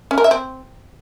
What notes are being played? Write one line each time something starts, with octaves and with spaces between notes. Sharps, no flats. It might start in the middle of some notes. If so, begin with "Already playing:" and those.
C#4
A#4
E5
C4